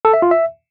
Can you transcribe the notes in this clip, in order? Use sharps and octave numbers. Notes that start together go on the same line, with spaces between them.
A4
E5
F4
E5